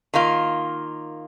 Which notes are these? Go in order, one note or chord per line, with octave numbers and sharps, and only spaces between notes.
D#3 A#3 F4